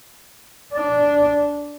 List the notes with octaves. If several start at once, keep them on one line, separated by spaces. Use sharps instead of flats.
D4